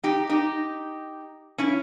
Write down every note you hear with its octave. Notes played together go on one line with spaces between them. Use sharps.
D#4 G4
D#4 G4
C#4 E4